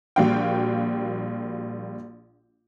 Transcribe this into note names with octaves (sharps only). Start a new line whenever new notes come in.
A#1 G3 A#3 F#4 F5 G5